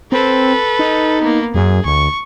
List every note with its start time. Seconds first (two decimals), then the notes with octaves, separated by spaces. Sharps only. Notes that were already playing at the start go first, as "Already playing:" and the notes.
0.12 C4 A4 B4
0.79 D#4
1.21 A#3 B3
1.54 F#2 G#4
1.85 D2 C#6